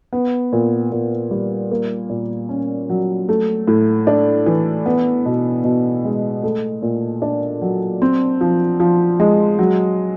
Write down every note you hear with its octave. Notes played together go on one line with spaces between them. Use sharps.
B3
A#2
A#2
G3
A#3
A#2
C#4
F#3
A3
A2
D4
E3
B3
B2
B2
G#3
A3
A#2
D4
F#3
C4
F3
F3
G#3
F#3